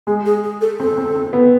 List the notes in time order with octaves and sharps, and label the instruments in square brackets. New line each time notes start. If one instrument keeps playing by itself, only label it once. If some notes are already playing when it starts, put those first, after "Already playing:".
[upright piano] G#3 [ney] G#4
[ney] G#4
G#4
A4
[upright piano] C4 [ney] A4
[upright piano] C4
C4
B3